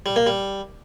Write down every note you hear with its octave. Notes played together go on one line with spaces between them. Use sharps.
G3
A#3
G3